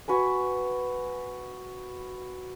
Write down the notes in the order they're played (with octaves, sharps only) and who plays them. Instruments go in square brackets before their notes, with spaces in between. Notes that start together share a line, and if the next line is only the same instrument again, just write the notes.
[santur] F#4 B4 G#5